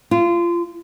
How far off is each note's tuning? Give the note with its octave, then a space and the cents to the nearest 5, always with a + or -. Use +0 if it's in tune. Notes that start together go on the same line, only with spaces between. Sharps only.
F4 -25